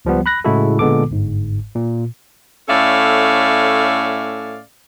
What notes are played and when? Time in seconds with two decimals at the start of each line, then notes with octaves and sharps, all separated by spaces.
0.05 C#2 F3 G3 B3
0.26 B5 F#6 A#6
0.44 A2 C#3 G#3 E4 F#4 A4
0.79 A#2 D3 G#3 B3 A4 D6
1.10 G1 G#2
1.75 A#2
2.69 A2 C#4 A4 D5 E5 F5